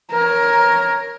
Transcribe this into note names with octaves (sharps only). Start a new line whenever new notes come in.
A#4 C#5